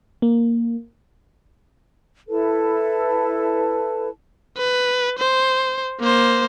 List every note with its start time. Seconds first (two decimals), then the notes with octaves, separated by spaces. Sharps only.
0.22 A#3
2.29 E4 A4 B4 A5
4.57 B4
5.19 C5
6.00 A#3 C5